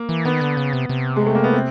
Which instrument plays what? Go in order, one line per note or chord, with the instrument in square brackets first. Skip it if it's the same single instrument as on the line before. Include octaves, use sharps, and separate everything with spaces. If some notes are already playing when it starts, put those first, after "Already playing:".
Already playing: [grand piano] A#3
[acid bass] E3
[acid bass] D#3 [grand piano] B3
[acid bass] D3
C#3
C3
C3
[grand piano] G#3
A3
A#3
B3
C4